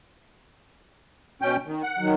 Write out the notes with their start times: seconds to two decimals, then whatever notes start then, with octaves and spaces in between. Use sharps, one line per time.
1.42 B2 C#4 G5
1.66 D#3
1.83 F#5
1.99 D#3 F#3